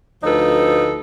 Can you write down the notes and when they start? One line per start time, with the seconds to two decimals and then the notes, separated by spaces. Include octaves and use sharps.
0.23 D2 F3 D#4 A4 B4